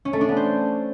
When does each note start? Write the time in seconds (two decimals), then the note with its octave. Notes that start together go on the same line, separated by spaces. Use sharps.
0.05 C#4
0.13 A3
0.21 D4
0.29 B3
0.37 C5